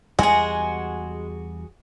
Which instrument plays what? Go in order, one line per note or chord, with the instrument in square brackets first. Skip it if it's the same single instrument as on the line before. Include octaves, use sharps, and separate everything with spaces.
[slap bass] E2 G3 [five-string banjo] G#3 [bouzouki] F#4 G#4